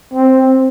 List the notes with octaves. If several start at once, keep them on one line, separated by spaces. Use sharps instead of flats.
C4